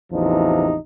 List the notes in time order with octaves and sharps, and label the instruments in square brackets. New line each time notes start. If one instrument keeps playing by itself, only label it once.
[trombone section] A1 E2 C3 F3 D#4